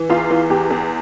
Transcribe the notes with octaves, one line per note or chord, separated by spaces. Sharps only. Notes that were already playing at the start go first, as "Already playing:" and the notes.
Already playing: E3
E2 F4
E3
E2 G4
E2